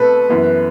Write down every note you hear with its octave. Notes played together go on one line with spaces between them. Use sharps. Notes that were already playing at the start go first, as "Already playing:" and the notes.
Already playing: B2 A3 C4 A4 B4
F#2 E3 B3